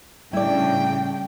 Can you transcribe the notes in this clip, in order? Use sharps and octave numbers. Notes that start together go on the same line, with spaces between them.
A2 C#3 G3 D4 E4 D5 G5